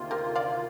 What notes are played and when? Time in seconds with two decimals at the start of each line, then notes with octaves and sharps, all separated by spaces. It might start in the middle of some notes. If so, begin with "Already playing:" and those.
Already playing: D2 C3 D#3 A#3 F4
0.11 G4 A#4
0.35 D5 F5